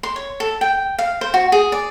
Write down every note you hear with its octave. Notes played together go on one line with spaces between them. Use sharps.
C6
C#5
A4
G5
F5
C5
F#4
G#4
D5